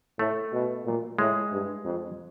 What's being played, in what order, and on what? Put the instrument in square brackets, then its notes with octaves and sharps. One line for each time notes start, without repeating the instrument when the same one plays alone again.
[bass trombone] A2 [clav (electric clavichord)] A3
[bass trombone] B2
A#2
[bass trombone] A2 [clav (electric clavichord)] G#3
[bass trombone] G2
F2